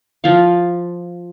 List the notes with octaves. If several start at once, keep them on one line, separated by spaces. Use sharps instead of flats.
F3 F5